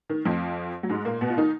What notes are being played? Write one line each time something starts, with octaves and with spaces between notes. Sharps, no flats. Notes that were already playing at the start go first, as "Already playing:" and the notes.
D#3
F2 F3
F#3
G#2 G#3
A#2 A#3
B2 B3
F4
D#3 D#4